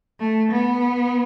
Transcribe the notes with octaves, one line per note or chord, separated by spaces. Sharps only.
A3
B3